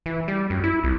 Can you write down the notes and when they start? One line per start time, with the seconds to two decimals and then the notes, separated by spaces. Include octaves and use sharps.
0.06 E3
0.28 G3
0.50 F#2
0.64 E4
0.84 C2